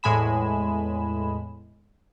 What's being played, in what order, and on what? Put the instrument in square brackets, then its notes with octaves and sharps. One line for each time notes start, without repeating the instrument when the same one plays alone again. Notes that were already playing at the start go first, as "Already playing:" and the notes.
[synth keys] E2 A2 G#3 G#5 B5 E7